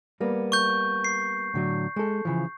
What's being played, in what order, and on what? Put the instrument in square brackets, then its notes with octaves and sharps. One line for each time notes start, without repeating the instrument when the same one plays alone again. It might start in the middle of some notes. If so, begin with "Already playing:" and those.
[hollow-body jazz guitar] G3 A#3 B3
[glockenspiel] C#6 G6
C7
[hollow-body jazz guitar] A2 D3 F#3
G#3 A4
C#3 E3 F3